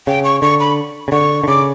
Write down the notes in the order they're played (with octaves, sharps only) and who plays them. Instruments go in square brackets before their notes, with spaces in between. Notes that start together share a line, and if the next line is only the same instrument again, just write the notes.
[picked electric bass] C#3 [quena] G5
[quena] C#6
[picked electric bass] D3 [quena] C#6
[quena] B5
[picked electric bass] C#3
[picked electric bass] D3 [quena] C#6
[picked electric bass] D3
[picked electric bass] C#3 [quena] D6